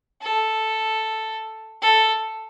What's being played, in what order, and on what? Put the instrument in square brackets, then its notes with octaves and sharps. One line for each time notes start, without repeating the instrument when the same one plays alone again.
[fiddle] A4
A4